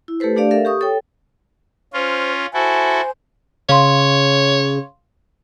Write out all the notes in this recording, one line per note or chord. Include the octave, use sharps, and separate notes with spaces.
E4
A3 G4 A4 B4 C5
A3 D4 G4 D5 F5
A4 A#4 E5 F5
G4 C#6 D#6
A4 C#5 G5
C#4 F4 C5
E4 F#4 A4 C5 G#5
C#3 C#5 F5 C6